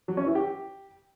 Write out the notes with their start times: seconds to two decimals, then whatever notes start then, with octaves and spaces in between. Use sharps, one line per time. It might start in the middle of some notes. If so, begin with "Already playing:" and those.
0.08 F#3
0.17 C#4
0.26 E3
0.35 G4